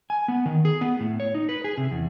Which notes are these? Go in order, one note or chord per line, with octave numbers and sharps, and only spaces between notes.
G#5
B3
D#3
G#4
B3
A2
C#5
D#4
B4
G#4
C3
E2